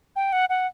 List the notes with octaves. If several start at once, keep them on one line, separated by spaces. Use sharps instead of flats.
G5
F#5
F#5